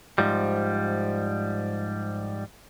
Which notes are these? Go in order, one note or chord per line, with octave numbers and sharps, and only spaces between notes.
G#2 F3 G3